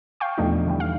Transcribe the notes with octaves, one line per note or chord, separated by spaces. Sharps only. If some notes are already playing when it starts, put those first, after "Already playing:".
F5 G5 C#6
E2 B2 F3 A3 D4 D#4
D3 E3 G3
F5